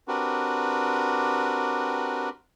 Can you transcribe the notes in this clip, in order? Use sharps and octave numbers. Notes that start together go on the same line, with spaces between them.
C4 D4 F#4 G4 A#4 B4